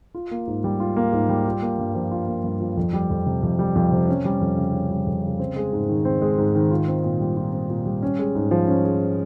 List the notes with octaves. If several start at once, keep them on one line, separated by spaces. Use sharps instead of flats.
F4
A#3
G#2
G3
F4
A#3
G#2
G3
F4
A#3
G2
F3
F4
A#3
G2
F3
F2
G3
F2
C3
F2
G3
F2
C3
C#4
G3
F2
C#3
C#4
G3
F2
C#3
C4
G#3
G#2
D#3
C4
G#3
G#2
D#3
F4
C4
A#2
G3
F4
C4
A#2
G3
C#4
G#3
G#2
F3
C#4
G#3